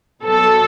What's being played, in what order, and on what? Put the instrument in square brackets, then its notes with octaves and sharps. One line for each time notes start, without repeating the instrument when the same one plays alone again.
[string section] B2 F#3 A4